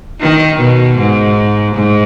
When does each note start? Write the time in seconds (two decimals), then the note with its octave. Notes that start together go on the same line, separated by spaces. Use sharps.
0.21 D#3
0.58 B2
0.98 G#2
1.75 G#2